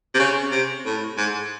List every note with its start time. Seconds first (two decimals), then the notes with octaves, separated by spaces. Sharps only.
0.15 C3
0.19 C#3
0.51 C3
0.85 A2
1.18 G#2